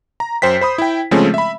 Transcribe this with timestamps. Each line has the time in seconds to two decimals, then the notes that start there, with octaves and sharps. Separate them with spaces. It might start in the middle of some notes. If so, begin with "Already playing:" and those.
0.20 A#5
0.42 F#2 C5 G5 B6
0.61 C5 B5 D#6
0.78 E4 G5
1.11 C#3 F3 G#3 A3 C4 C#4
1.34 E5 B5